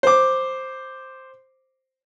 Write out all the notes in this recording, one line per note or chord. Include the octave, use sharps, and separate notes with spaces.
C5 D6